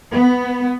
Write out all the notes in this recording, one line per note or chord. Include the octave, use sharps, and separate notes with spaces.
B3